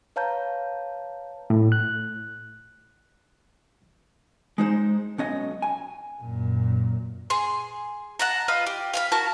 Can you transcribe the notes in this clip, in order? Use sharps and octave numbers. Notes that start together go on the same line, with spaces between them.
B4 C#5 F5 A5 A#5 G6
A2
F#6
G#3 D#4 C5
B1 C#4 D#5
G#5
F#2 A#2
G#4 C6
F#5 A5 A#5
F4 B4 D#5 B5
G4
F5 G#5 B5
F#4 A#4 A5